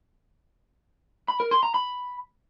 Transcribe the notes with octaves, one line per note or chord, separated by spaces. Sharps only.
B5
A#4
C6
A#5
B5